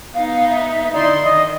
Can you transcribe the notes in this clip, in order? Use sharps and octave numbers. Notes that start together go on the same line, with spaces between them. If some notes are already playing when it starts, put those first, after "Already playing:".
B3 D#4 F5
E5
D3 D#4 E4 D5 C6
D#3 D#5